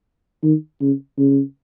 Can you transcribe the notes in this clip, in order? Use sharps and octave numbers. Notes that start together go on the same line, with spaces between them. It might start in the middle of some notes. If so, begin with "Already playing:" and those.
D#3
C#3
C#3